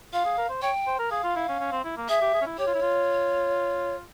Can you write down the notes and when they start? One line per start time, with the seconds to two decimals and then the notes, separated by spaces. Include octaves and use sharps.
0.13 F4 F5
0.25 G#4
0.38 A#4
0.49 C5
0.62 C#5 G5
0.87 C5
0.99 A#4
1.11 G#4 F5
1.23 F4
1.36 E4
1.48 C#4
1.59 C#4
1.72 C4
1.84 E4
1.97 A#3
2.09 G#4 E5
2.22 G4
2.34 G#4
2.42 C#4
2.46 E4
2.58 G4 C#5
2.67 F4
2.74 E4
2.82 F4